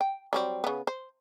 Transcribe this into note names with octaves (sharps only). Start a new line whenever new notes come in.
G5
F#3 G3 C4
C#3 B3
C5